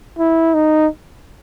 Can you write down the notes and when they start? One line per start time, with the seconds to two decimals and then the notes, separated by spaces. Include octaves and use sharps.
0.18 E4
0.54 D#4